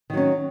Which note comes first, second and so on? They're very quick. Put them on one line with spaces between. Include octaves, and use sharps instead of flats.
D#3 F#3 C#4